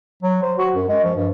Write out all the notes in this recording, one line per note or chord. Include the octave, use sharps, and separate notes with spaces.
F#3
C5
F#4
F#2
G#3
F3
G2